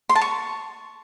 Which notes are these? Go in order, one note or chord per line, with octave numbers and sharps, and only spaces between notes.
C6
A5
C#6